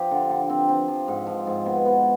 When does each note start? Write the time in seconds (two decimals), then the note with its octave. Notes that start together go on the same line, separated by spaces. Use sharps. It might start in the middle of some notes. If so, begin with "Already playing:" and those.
Already playing: F3 C4 G4
0.11 D3
0.30 D3
0.49 C4
0.69 C4
0.88 F3
1.08 G#2
1.27 F3
1.47 G#2
1.66 B2
1.85 B3